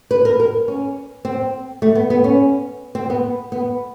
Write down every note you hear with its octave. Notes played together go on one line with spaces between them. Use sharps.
B4
A#4
A#4
C#4
C4
A3
B3
B3
C#4
C4
B3
B3